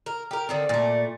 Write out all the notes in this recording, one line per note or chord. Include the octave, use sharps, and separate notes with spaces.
A#4
G4 A#4
D3 D#3 C4 D5
A#2 A3